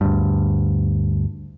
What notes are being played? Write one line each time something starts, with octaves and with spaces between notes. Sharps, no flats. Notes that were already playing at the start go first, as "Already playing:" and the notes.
D2 G2